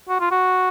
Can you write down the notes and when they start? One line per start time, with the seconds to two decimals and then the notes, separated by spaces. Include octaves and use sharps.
0.09 F#4
0.20 F4
0.31 F#4